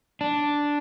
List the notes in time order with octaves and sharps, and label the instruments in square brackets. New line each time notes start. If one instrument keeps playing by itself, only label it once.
[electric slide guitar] D4